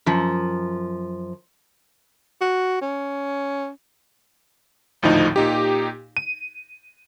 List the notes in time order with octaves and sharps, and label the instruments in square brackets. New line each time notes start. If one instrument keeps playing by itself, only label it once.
[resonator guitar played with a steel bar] F#2 F3
[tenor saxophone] F#4
C#4
[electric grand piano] G#1 D2 A2 F3 D#4
A#2 D#4 G4
D#7